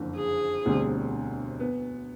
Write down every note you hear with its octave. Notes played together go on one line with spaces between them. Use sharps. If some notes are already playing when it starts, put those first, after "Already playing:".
Already playing: F#1 F2 D3
G#4
E1 D2 D3 G3 C4
B3